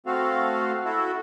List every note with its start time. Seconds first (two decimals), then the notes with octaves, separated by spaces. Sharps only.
0.06 A3 C4 F#4 A4 F5
0.84 E4 F#4 A4